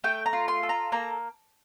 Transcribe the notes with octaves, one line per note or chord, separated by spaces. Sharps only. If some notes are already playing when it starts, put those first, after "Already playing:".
A3 G5
A#5
F4
C6
A4
A#5
A#3 A#5